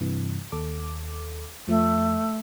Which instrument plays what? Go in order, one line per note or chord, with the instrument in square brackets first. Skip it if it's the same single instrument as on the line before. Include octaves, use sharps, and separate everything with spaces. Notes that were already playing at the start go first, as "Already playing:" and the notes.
[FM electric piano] G2 C3 E3
D#2 A4 D6
[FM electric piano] F2 F3 [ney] A3